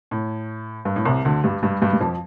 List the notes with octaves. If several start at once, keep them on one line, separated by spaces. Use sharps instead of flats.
A2
G2
A2
C2 C3
D2 D3
G2 G3
G2 G3
G2 G3
G3
F2 F3